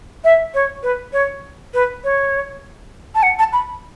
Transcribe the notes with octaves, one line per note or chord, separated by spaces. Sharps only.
E5
C#5
B4
C#5
B4
C#5
A5
F#5
A5
B5